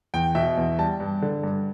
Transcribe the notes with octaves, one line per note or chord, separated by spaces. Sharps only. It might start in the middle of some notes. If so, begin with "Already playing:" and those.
E2 G5
B2 E5
E2
G3 A5
G2
D3
G2